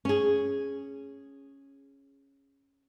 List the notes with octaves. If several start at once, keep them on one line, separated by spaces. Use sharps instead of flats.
C#4 G#4